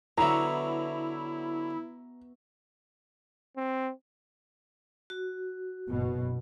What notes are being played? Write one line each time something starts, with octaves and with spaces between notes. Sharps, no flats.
D3 F#3 B3 E4 F#4 E5 A#5
C4
F#4
F#1 B2